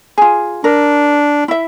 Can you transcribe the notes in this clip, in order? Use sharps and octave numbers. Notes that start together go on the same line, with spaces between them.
F4 G#4
D4 A#4
E4 E5